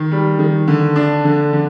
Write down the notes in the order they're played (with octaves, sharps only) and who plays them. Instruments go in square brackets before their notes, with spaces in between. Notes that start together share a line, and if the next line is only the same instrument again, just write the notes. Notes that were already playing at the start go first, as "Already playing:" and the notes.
Already playing: [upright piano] D#3
G3
D#3
D3
D4
D3
D3